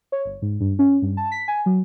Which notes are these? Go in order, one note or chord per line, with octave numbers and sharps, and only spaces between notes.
C#5
G1
G#2
G2
C#4
G2
A5
B6
G#5
F#3